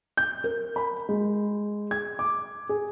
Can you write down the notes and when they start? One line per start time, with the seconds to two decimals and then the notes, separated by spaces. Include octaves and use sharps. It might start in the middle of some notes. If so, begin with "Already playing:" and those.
0.17 G6
0.44 A#4
0.76 B5
1.09 G#3
1.91 G#6
2.19 D6
2.69 G#4